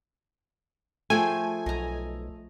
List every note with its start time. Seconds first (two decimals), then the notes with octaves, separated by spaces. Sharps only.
1.10 F3 A3 G#4 G5 G#5
1.66 B1 D#5 A#5